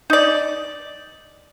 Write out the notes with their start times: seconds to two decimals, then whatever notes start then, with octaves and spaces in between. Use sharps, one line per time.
0.10 D#4 D5